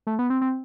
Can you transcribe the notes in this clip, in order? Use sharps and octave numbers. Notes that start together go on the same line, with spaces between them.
A3
B3
C4
C4